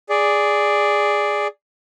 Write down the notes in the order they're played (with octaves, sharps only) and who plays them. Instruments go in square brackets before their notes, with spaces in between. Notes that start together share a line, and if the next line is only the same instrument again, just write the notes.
[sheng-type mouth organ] G#4 D5